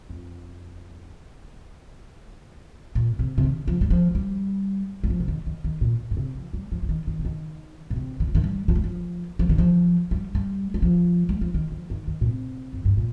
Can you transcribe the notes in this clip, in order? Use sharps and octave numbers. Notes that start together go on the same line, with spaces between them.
F2
A#2
C3
C3
D#3
F3
G3
F3
G3
G3
F3
C3
D#3
D#3
D#3
A#2
A#2
C3
F3
G3
F3
F3
D#3
D#3
C3
D#3
A#2
C3
D#3
F3
D#3
G3
F3
G3
F3
F3
D#3
F3
G3
G3
G3
F3
G3
F3
D#3
F3
D#3
D#3
A#2
C3
F2
G2
A#2